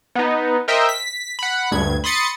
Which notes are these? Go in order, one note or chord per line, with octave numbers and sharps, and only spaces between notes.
B3 D#4
A#4 C5 D#5 E5 G5
B6
F#5 B5
D2 G2 G#6
B5 C6 D#6 A6 C#7